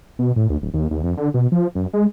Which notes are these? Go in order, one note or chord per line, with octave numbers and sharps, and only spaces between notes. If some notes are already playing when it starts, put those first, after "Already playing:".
B2
A2
D2
D1
D#2
D#2
F2
D3
B2
F3
F#2
G#3